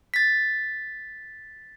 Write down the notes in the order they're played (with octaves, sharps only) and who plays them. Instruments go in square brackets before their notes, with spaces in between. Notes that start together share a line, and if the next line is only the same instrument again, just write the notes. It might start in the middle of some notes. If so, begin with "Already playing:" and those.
[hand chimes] A6 B6